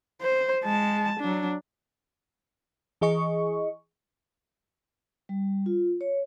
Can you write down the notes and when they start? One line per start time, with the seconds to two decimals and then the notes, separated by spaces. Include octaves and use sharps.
0.21 C5
0.65 G#3 A5
1.20 F#3 D4
3.01 E3 G#4 D#5 C#6
5.29 G3
5.66 F4
6.01 C#5